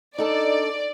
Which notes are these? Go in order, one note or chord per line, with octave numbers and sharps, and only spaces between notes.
D4 D#4 A4 D5 A5